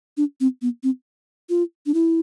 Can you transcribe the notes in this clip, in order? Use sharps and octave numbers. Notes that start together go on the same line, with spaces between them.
D4
C4
B3
C4
F4
D4
E4